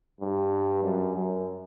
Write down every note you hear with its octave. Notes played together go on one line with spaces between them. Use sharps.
G2
F#2
F#2